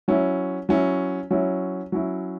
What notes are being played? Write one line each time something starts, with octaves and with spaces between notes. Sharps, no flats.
F#3 C#4 E4
F#3 C#4 E4
F#3 C#4 E4
F#3 C#4 E4